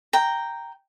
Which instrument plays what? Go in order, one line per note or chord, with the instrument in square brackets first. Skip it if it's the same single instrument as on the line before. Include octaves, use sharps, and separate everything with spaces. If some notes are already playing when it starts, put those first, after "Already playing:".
[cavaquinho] G5 A#5